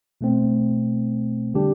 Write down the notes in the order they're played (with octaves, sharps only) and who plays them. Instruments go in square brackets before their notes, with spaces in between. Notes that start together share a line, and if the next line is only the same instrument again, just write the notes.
[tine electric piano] B2 A3 C4
D3 G3 D4 G4